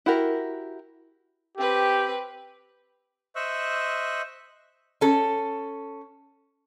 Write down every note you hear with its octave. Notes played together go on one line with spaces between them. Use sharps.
E4 F#4 G4 A#4
C4 G4 B4
C5 D#5 E5 C#6 E6 F#6
C#4 A4